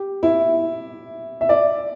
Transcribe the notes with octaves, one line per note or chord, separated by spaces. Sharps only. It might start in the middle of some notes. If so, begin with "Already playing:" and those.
Already playing: G4
E4
E5
D5